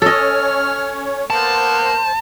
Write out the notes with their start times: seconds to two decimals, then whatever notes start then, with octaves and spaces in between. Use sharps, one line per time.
0.02 C#4 A4 C#5 D#5 F6
1.30 A#3 B3 A#4 C5 A5